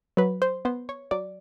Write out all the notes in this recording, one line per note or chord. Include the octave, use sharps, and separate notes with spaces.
F#3 B4
C5
B3 C5
C#5
F#3 D5